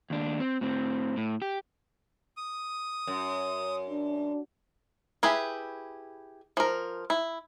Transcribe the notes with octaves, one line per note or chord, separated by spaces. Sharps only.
D#2 D4
C4
A2 C4
A2
G4
D#6
F#2
D4
E4 G4 G#4 B4
F3 A#4
E4